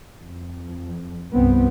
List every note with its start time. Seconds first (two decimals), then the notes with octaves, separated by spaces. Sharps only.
0.22 F2
1.33 C2 G2 B3 C4